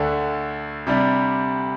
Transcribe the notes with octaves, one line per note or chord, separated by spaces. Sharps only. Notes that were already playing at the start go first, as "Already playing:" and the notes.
Already playing: D2 D3 A3 D4
C3 G3 D4